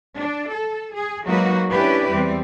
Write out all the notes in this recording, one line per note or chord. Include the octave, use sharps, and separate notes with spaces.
D4
A4
G#4
F#3 G#3 A#3 D#4 F#4 B4
C#4 D4 E4 G4 B4
E2 G3 C4